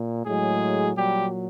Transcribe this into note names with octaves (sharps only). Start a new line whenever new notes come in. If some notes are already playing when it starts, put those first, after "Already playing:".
Already playing: A#2
A2 F#3 G#3 G#4
A#2 F#3 G3 G4